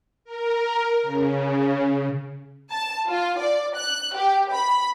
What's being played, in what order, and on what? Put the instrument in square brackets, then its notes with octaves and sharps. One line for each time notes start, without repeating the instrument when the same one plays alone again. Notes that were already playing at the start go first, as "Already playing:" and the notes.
[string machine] A#4
C#3
[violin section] A5
F4
D5
F#6
G4
B5